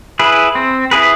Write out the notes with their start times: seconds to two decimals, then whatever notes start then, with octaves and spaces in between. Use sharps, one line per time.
0.19 E4 G#4 B4
0.55 C4
0.91 E4 G#4 B4